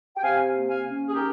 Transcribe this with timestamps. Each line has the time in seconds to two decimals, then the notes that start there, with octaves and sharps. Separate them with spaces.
0.17 G5
0.22 C3 F5 G#5
0.53 A#3
0.68 F5 G#5
0.84 C#4
1.09 G#4
1.15 D#3 G4 A#4